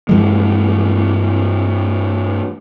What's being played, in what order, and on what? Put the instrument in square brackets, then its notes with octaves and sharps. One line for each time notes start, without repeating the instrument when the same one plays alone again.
[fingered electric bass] G2 E3 G#3